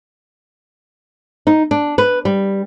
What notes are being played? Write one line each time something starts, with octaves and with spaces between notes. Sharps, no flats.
D#4
D4
B4
G3